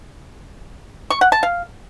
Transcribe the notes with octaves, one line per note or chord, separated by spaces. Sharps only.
C#6
F#5
A5
F5